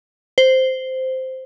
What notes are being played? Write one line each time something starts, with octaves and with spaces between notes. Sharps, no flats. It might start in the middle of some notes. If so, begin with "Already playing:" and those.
C5